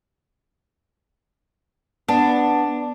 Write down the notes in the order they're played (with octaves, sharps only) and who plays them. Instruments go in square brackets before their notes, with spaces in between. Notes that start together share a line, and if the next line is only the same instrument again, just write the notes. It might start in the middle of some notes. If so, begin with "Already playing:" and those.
[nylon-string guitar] B3 [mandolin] D4